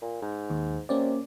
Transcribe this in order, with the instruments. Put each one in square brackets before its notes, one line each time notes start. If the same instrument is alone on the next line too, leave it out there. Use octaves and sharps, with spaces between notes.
[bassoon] A#2
G#2
[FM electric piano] D#2
[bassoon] C3 [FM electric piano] A#3 C#4 D5